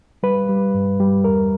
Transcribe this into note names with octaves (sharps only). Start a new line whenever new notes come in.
G3 B4
G3
G2
G3
E2 A#4